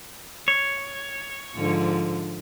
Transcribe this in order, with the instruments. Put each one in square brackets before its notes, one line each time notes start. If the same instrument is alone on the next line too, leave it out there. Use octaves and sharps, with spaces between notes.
[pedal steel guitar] C#5
[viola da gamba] G#2 D3 F3